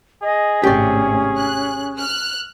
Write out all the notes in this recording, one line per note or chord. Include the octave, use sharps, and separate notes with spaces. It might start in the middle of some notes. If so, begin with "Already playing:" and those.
G#4 D#5
G#1 A2 C3 C#4 G4 D5
F#6
F6 F#6